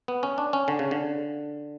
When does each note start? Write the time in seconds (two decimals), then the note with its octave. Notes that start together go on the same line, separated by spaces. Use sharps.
0.08 B3
0.23 C#4
0.38 D4
0.53 C#4
0.68 D3
0.79 C#3
0.91 D3